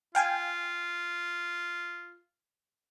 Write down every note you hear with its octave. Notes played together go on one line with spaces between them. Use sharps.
F4 F5 G5 G#5